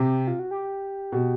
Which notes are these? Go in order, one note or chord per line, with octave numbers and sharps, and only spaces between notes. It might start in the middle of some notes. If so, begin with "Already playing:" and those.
Already playing: C3 G4
F4
F#4
G4
B2